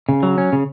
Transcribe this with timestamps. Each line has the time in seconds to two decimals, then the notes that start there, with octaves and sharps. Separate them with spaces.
0.09 C#3
0.23 F#3
0.38 C#4
0.53 C#3